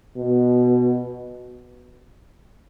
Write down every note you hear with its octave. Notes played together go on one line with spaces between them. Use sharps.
B2